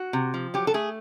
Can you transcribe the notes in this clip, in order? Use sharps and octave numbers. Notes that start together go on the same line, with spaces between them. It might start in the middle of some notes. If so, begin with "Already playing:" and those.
Already playing: F#4
C3
F3
F#3 G4
A4
A3 G#4